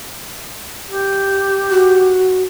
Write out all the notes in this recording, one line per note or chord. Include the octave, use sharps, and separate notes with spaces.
G4
F#4